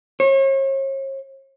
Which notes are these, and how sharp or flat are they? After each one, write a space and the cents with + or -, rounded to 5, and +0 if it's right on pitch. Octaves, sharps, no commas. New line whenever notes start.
C#5 -40